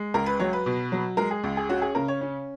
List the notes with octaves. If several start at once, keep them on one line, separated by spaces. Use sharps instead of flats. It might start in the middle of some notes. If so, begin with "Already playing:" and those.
Already playing: G#3
C#2 A#4
B4
F#3 C#5
B4
B2
F#3
G#3 A#4
G#4
C#2
G#4
C#4 F#4
G#4
C#3 A#4
C#5
C#4